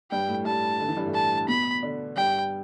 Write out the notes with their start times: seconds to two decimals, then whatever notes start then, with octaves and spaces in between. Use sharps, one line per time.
0.11 G2 G3 G5
0.28 A2 A3
0.45 G2 G3 A5
0.79 D3
0.89 E3
0.97 G2 G3
1.06 A2 A3
1.14 A5
1.48 B2 B3 B5
1.83 D3 D4
2.16 G2 G3 G5